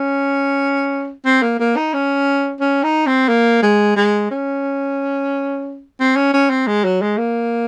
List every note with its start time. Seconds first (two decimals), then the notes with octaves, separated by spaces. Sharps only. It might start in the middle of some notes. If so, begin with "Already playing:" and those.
Already playing: C#4
1.25 C4
1.42 A#3
1.59 A#3
1.76 D#4
1.94 C#4
2.60 C#4
2.83 D#4
3.07 C4
3.28 A#3
3.63 G#3
3.96 G#3
4.31 C#4
6.00 C4
6.16 C#4
6.34 C#4
6.50 C4
6.67 G#3
6.84 F#3
7.02 G#3
7.18 A#3